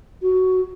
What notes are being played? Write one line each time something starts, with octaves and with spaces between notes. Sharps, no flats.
F#4